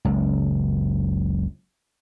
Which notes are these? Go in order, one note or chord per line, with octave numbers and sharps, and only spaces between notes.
F#1 C#2